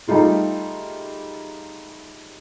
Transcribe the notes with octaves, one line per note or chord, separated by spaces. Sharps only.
G3 A3 D#4 F4 G#4